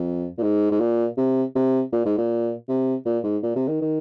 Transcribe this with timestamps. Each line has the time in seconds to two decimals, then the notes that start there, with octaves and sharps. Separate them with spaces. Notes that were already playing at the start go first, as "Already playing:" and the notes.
Already playing: F2
0.38 A#2
0.43 G#2
0.72 G#2
0.80 A#2
1.17 C3
1.55 C3
1.92 A#2
2.05 G#2
2.18 A#2
2.69 C3
3.05 A#2
3.24 G#2
3.43 A#2
3.56 C3
3.68 D#3
3.81 D#3